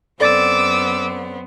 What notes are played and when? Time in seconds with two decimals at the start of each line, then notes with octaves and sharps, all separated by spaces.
0.20 F#2 B3 C4 A4 D5 D6 E6 A6